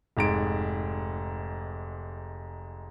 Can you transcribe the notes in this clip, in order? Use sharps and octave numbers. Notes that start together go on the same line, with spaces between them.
F1 G#2 D7